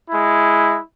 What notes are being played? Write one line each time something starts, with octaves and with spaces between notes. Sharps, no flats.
G#3 E4